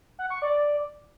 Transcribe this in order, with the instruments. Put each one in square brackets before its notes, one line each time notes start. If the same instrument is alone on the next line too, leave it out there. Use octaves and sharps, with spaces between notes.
[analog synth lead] F#5
C#6
D5